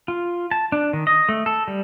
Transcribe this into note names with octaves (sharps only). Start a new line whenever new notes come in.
F4
A5
D4
D#3
D#5
A3
A4
G3